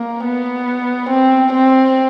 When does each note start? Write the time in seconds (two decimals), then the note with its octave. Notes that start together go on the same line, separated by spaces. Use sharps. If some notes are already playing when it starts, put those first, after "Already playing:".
Already playing: A#3
0.24 B3
1.09 C4
1.53 C4